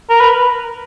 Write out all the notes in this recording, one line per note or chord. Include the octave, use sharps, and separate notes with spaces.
A#4
B4